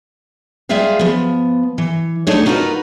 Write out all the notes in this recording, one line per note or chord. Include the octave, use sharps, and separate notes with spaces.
G3 G#3 F4 G#4 E5 F5
F3 B3
E3
A3 D4 D#4 C#5
D#4 F4 F#4 A#4 B4